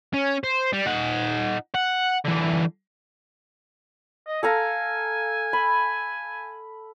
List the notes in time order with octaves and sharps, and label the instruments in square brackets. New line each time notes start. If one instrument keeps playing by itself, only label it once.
[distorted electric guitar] C#4
C5
G3
D#4 F#5
F#5
D3 E3
[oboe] D#5
[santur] A4 F5 A#5 [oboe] G#5
[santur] B5